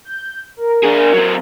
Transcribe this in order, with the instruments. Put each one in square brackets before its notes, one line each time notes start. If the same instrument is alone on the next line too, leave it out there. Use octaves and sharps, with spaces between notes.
[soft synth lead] G6
A#4
[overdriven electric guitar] D4 G#4
F#3 C4